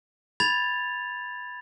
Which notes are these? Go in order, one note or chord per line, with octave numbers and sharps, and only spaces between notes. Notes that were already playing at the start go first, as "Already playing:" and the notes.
B5 G#6 A6 F7